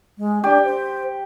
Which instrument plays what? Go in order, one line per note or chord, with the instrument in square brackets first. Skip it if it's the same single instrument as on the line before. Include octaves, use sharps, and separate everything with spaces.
[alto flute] G#3
[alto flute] D4 [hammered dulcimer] G4
[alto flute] C5